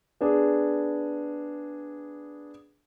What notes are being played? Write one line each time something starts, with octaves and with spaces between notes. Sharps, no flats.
B3 D4 G#4